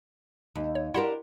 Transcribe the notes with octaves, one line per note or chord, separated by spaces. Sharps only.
D#2
C#5
D4 E4 G4 A#4 F#5 C6